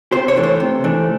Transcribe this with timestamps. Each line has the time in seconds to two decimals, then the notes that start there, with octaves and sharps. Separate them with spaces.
0.12 C3 C5
0.28 C#5
0.36 E3 A3 D4
0.43 C5
0.60 C3
0.84 E3 A3 D4